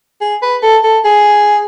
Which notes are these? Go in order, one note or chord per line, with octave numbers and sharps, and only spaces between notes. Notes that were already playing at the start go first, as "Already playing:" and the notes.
G#4
B4
A4
A4
G#4